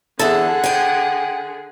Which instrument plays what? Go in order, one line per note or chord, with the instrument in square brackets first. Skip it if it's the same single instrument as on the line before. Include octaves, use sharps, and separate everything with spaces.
[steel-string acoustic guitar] E2 A4 [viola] D3 G#4 [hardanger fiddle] F#5
[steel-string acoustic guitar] G5 G#5